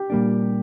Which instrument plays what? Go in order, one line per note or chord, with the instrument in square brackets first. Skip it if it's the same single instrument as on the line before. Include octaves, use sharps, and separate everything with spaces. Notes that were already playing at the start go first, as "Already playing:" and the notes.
Already playing: [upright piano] G4
[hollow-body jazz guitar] A#2 G3 A#3 D4